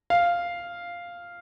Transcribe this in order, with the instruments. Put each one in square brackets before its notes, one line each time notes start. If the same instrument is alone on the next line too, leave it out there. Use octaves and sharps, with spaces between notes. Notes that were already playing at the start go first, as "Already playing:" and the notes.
[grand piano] F5